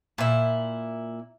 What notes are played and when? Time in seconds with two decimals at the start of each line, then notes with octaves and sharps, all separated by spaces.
0.18 A#2 E4